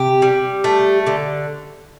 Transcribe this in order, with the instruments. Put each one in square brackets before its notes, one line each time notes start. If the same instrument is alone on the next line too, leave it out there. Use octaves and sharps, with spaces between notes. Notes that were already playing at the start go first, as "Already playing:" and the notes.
Already playing: [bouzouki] C3 G4
G3
A3
D3